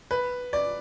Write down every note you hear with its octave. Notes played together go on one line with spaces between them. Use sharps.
B4
D5